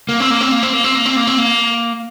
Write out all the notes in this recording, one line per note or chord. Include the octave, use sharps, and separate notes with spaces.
A#3
C4
A#3
C4
A#3
C4
A#3
C4
A#3
C4
A#3
C4
A#3